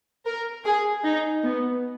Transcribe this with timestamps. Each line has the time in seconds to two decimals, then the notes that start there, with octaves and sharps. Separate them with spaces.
0.25 A#4
0.64 G#4
1.04 D#4
1.43 B3